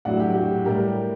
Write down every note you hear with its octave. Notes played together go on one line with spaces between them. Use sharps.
A2 F#3 D5 F#5
G4
G4
F#4
G4
A2 G3 G4 A#4